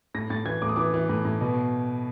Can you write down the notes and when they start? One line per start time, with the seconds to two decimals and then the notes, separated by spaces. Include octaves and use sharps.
0.14 A2 A#6
0.30 A2 A6
0.45 E3 G#6
0.62 A2 D6
0.69 D#6
0.76 E3 D6
0.94 E3
1.09 A2
1.25 A2
1.41 B2